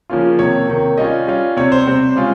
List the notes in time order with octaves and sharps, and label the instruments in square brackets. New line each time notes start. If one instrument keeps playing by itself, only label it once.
[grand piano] C#3 F3 A#3 C#4 F4
C3 D#3 A#3 C#5
C3 D#3 A#3
G3 C#4 F4 D#5
G3 C#4 F4
C3 G3 C4 C#5
C5
C3 G3 C4
C#3 G#3 C#4 F4